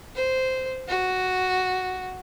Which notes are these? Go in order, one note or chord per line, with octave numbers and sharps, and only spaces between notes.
C5
F#4